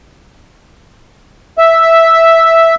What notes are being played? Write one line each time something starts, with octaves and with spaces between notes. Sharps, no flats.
E5